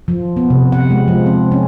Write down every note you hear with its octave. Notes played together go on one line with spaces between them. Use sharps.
F3
B3
C3
F#5
G#3
F3
C4
C#4